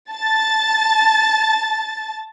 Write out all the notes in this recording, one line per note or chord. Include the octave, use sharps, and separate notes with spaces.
A5 A6